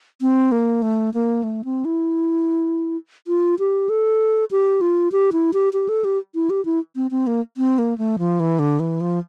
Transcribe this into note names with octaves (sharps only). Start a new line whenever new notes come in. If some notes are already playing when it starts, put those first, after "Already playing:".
C4
A#3
A3
A#3
A3
C4
E4
F4
G4
A4
G4
F4
G4
E4
G4
G4
A4
G4
E4
G4
E4
C4
C4
A#3
C4
A#3
A3
F3
E3
D3
E3
F3